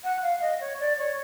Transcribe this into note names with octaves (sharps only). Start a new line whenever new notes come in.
F#5
F5
D#5
C#5
D5
C#5